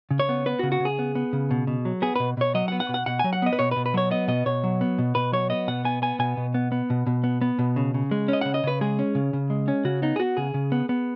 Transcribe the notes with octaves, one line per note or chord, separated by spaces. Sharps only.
C#3
C#5
B3
B3 B4
F#4
C#3
F#4
C#3
G#4
B3
B3
C#3
B2
B2
F#3
B3 G#4
B2 B4
B2 C#5
F#3 D#5
F#5
B3
F#5
B2
F#5
B2 F#5
F#3 G#5
F#5
B3 D#5
B4
B2 C#5
B2 B4
B4
F#3 C#5
B3 D#5
B2 D#5
B2 C#5
F#3
B3
B2
B2 B4
F#3 C#5
B3 D#5
B2 F#5
B3 G#5
B3 G#5
B2 G#5
B2
B3
B3
B2
B2
B3
B3
B2
C#3
C#3
G#3
C#4 D#5
C#3 F#5
D#5
C#3 B4
G#3 G#4
C#4
C#3
C#3
G#3
C#4
C#3 F#4
B3 D#4
G#4
B3 F#4
C#3 G#4
C#3
B3
B3